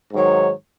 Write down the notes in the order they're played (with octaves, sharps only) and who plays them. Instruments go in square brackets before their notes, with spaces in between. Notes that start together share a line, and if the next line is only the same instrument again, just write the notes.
[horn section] G#2 D#3 F#3 C#5